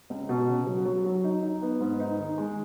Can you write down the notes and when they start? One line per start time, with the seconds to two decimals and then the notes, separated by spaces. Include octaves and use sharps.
0.10 C#2
0.29 B2
0.48 C#3
0.67 F#3
0.85 F#3
1.04 F#3
1.24 D#4
1.42 D#4
1.62 B3
1.80 G#2
2.00 D#4
2.18 D#3
2.38 G#3